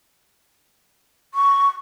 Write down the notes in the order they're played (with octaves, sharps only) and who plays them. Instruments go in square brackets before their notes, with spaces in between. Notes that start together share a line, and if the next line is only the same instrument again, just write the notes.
[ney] C#6